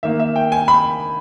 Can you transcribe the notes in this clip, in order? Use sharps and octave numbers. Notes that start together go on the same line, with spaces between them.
D#3 A#3 E5
E5
G5
G#5
B5